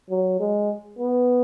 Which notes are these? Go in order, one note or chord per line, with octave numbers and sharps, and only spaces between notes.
F#3
G#3
B3